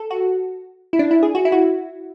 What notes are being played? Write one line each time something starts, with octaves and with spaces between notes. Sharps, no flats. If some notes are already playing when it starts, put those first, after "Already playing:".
Already playing: A4
F#4
E4
D4
E4
G#4
F#4
E4
F#4